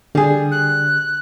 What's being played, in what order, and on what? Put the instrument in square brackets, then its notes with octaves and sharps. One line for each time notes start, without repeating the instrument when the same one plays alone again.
[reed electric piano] D3 [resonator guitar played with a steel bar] G3 G#4
[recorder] F#6